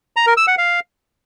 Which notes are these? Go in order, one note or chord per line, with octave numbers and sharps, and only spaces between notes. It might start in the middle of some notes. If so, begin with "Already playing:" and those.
A#5
A#4
E6
F#5
F5